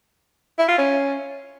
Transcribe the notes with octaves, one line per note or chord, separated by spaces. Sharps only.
E4
F4
C#4